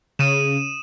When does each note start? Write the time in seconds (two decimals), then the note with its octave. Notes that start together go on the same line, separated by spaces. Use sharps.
0.19 C#3 D#6 D#7 E7